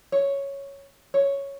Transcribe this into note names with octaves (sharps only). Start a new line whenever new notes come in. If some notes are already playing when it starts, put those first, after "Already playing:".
C#5
C#5